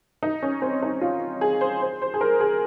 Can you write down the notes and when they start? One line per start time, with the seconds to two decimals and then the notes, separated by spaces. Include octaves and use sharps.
0.23 D#4
0.42 C#4
0.62 C4
0.82 D#4
1.01 F4
1.41 G#4
1.61 C5
1.82 C5
2.02 C5
2.14 G#4
2.21 A#4
2.40 G#4